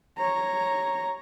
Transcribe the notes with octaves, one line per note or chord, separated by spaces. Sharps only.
C#5 A#5